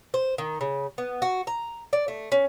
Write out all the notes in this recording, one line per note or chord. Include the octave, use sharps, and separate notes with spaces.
C5
D#3
C#3
B3
F#4
A#5
D5
A3
C#4